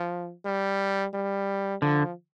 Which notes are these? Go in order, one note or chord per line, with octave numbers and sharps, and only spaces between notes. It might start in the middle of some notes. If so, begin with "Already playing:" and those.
Already playing: F3
G3
G3
D3 F3